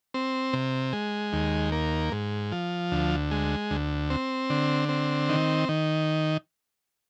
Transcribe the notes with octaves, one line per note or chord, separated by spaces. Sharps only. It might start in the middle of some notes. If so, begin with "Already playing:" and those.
C4
C3
G#3
D#2
A#3
G#2
F3
D2
G#3
D2
C4
D3
C4
D#3
D#3